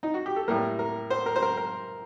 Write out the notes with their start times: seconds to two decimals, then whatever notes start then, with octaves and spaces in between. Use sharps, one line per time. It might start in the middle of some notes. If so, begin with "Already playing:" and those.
0.03 D#4
0.14 F#4
0.26 G4
0.36 A4
0.48 A2 G3 A#3 A#4
0.79 A#4
1.10 C5
1.26 A#4
1.36 C5
1.42 A#4
1.57 A#4